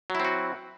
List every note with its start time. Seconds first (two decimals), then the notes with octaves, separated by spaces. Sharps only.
0.10 F#3
0.15 E4
0.20 C4
0.25 F#4